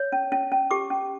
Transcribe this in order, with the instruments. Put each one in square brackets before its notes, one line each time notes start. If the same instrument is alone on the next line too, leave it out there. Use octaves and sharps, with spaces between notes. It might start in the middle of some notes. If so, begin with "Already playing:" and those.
Already playing: [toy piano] C#5
C#4
C#4
C#4
G4 D6
C#4